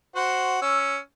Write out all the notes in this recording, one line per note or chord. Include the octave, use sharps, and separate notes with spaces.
F#4 C5 F#5
C#4 E6